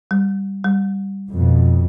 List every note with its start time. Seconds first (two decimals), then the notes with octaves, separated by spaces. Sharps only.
0.11 G3
0.65 G3
1.31 F2 B2